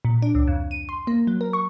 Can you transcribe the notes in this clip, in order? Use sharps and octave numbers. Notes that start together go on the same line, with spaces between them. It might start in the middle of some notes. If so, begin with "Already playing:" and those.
A#2
D4
C#2
F2
D#7
C6
A#3
F#3
A#4
C#6